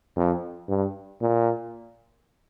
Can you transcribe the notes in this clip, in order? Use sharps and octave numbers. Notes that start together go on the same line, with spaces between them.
F2
G2
A#2